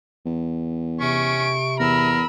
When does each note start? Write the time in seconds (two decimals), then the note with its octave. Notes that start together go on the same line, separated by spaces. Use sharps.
0.26 E2
1.00 C3 C#4 C#6 D7
1.80 E2 A#4 B5 E6